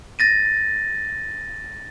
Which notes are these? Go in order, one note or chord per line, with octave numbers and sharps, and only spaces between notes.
A6 A#6 D#7